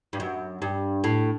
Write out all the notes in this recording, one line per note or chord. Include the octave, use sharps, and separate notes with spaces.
G2
F#2
G2
A2